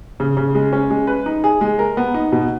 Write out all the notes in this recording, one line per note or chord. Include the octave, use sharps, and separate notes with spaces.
C#3
C#3
G#3
C#4
G#3
B4
D#4
G#4
G#3
A#4
B3
D#4
B2